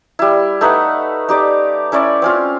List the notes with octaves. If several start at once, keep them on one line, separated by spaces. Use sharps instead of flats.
G3 E4
A3 D#4 B4 F#5
D#4 G4 D5
C#4 E4 C#5 D5
C4 C#4 F4